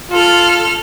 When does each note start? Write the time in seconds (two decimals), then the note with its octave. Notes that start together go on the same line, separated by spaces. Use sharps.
0.11 F4 A4 F6